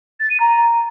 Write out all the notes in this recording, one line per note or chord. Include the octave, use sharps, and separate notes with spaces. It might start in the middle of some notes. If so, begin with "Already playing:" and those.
A6
D#7
A#5